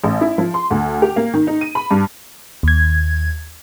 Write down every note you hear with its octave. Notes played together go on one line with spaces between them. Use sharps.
A1
E4
F3
C6
D2
G4
A#3
D#3
D#4
D#7
B5
G2
D#2 G#6